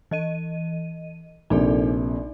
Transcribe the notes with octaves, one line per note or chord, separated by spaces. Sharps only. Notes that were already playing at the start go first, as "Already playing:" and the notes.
E3 D#5 D#7
A#1 C3 D#4 A4 D5